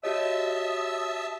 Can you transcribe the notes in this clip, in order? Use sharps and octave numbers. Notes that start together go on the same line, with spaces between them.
F#4 G4 C#5 D#5 E5 A5 E6